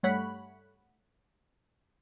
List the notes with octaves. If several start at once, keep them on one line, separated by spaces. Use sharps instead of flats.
G2 G3 A3 C#5 F#5 B5